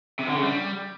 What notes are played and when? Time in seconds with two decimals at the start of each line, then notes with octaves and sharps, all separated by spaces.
0.19 C3
0.27 D3
0.35 C#3
0.43 G3